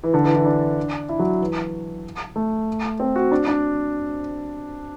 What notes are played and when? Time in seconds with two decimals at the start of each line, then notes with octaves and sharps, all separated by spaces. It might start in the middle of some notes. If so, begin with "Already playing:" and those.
0.03 E3
0.14 D3
0.24 E3
0.35 E3
0.46 D4
1.09 E4
1.19 F#3
1.41 E3
2.36 A3
3.00 C4
3.16 F#4
3.32 D4
3.47 D4